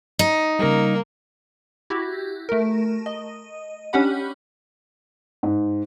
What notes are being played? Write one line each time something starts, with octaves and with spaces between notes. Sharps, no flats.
D#4
C#3 G3 A#3
E4 F#4 G4
A3 A#4
D#5
C#4 D4 G4 F#5 B5
G#2